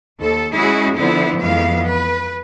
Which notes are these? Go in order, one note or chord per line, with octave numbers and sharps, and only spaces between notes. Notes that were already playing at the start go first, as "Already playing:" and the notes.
D#2 A4
G#3 C#4 E4 F#4 G#4
D3 F3 B3 C4 E4
F2 E3 G#3 B3 F5
B4